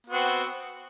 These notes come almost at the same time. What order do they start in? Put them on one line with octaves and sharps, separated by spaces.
B3 F#4 C4